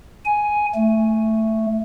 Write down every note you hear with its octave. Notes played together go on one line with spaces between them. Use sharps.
G#5
A3